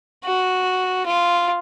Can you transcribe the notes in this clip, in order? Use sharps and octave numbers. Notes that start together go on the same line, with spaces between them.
F#4
F4